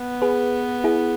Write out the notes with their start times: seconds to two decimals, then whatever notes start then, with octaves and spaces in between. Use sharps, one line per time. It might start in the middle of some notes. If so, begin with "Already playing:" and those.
Already playing: B3
0.22 G#4 B4
0.84 E4 G#4